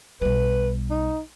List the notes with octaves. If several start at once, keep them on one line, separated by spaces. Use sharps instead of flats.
B1 G3 B4
D#4